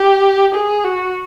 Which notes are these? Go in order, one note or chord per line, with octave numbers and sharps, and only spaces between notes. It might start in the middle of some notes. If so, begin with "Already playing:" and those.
Already playing: G4
G#4
F#4